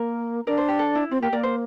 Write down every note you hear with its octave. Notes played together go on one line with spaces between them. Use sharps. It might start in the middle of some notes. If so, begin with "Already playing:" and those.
Already playing: A#3 A#4
D4 A#4 D5
C5
G4
A4
E4
C4 F4
A#3 G4
A#3 A#4 D5
C5